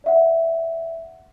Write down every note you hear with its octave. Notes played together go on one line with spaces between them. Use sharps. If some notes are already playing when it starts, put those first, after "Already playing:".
D5 E5 F#5